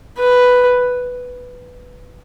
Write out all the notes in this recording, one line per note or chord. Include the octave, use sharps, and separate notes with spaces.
B4